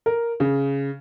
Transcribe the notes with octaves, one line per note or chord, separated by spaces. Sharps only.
A#4
C#3